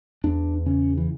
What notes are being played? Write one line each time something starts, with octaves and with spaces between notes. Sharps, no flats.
E2 D4
C#3 C#4
E3